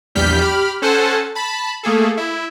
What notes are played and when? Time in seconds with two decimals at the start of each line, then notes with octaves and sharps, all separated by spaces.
0.15 A#1 E2 G3 F6 G6 B6
0.41 G4 B5 F6
0.82 C#4 A4 C5 F#5 G#5 A5
1.35 A5 B5
1.83 A3 A#3 G#4 A4
2.17 E4